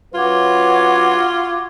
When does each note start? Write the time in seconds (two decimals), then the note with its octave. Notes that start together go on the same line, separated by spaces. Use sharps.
0.14 F#3 C#4 F4 F#4 B4 D6 G#6